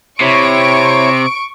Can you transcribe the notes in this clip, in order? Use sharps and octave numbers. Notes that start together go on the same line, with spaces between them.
C3 E4 C#5 C#6 D7